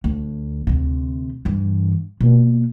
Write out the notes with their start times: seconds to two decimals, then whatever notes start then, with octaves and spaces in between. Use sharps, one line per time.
0.04 D2
0.67 D2 C3
1.45 G2 E3
2.20 B2 A#3